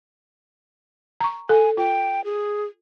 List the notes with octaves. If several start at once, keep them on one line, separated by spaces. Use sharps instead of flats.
A#5 C#6
A4 G#5
F4 G5
G#4